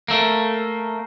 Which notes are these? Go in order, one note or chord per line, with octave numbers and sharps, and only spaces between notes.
A3 A#3